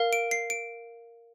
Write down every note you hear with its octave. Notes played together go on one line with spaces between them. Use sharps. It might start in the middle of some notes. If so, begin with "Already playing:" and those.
Already playing: A#4 F5
D7
C7
D7